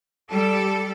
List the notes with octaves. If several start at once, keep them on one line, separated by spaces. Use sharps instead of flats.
G3 A4